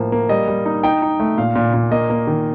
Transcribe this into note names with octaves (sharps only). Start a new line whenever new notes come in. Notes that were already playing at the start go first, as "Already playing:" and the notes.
Already playing: A2 F3 A#3
A#3
G3 D#5
G3
D#4
D#4 G5
D#4
A3
A#2 F5
A#2
A#2
A#3 D#5
A#3
D#3